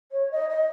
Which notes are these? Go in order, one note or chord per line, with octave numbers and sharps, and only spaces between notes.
C#5
D#5
D#5